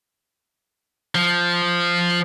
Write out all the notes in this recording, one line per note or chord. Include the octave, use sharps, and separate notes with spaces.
F3